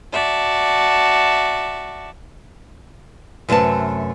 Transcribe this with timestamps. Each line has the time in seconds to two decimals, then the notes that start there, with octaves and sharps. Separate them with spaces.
0.13 F#4 D5 E5 A5
3.49 F#2 C3 A3 B4 A5